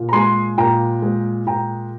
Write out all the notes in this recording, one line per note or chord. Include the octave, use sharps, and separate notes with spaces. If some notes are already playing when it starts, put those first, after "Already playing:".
Already playing: A#2
A#5
G#3 G#5 C6
A#2 G5 A#5
G#3
A#2 G5 A#5